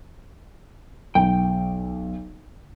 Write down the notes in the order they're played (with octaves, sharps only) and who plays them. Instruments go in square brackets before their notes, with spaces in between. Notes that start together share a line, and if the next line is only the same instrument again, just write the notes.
[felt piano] B1 [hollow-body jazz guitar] G5